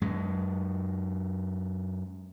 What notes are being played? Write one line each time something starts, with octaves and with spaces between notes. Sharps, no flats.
F#2 G#3